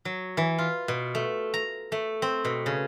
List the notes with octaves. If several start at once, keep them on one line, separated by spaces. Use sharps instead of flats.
F#3
E3
F4
B2
A3
A#5
A3
C4
B2
C#3